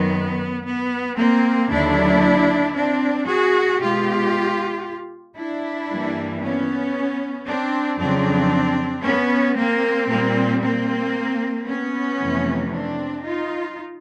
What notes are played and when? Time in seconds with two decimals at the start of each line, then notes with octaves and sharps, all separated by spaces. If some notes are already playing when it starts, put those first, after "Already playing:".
Already playing: F#2 D#3 F#3 B3
0.65 B3
1.17 A#3 C4
1.70 D#2 D3 F#3 D4 E4
2.75 C4 D4
3.27 F#4 G#4
3.79 B2 G#3 F4 G4
5.37 D4 E4
5.90 G2 E3 G3 A#3
6.42 B3 C#4
7.46 C4 D4
7.98 F2 C#3 F#3 C4 D4
9.03 B3 C#4
9.56 A#3 C4
10.09 A#2 G3 A#3
10.62 A#3 C4
11.66 B3 C#4
12.18 F2 C3 E3 A3
12.71 C4 D4
13.23 D#4 F4